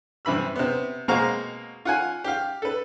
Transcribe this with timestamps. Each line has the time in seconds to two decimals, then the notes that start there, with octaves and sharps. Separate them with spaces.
0.25 G2 C3 E3 B5 E6
0.56 C3 B3
1.08 B2 G#3 A#3 C4 F5 A#5
1.85 F4 F#5 G#5
2.24 G4 F5
2.62 A4 B4